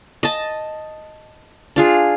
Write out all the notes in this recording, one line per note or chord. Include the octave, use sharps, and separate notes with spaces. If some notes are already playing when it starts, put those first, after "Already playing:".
D#5 A5
D4 F4 G#4